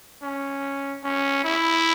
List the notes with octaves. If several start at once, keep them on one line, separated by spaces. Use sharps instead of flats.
C#4
C#4
E4